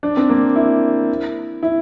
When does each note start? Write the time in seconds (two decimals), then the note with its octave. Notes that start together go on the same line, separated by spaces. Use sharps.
0.03 D4
0.17 C4
0.29 A#3
0.56 E4
1.63 E4